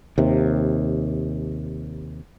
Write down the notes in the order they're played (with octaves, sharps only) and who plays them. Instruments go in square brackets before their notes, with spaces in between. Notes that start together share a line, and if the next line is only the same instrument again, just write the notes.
[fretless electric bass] D#2 C3